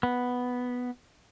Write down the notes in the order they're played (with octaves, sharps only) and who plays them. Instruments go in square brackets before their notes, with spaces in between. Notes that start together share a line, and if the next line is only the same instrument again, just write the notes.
[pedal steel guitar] B3